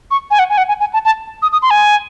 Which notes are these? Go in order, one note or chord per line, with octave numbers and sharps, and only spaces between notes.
C#6
G#5
F#5
G#5
F#5
G#5
G#5
A5
A5
D#6
D#6
C6
G#5